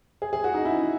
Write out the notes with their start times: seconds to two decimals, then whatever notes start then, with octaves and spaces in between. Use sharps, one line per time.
0.22 G#4
0.33 G#4
0.44 F#4
0.54 D#4
0.65 E4